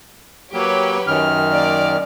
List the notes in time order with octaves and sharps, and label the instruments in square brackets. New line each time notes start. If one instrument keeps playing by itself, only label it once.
[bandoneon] F#3 A#3 [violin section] G4 B4 C#5
[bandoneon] F#2 D#3 F6
[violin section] A#3 D5 F5